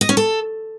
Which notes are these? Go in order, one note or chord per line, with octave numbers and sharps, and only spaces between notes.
D#5
C#4
A4